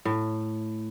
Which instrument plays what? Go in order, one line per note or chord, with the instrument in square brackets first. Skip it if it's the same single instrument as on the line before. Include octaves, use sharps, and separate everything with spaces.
[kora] A2